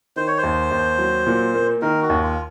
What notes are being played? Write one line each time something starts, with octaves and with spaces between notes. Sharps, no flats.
D#3 C5
C#5
C5
D#2
D#2
F#3
A#2
A#3
D#3 A#4
F#4
D#2
F4